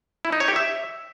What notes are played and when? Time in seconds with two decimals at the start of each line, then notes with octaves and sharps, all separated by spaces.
0.25 E4
0.32 D#4
0.40 C#5
0.48 G4
0.56 E5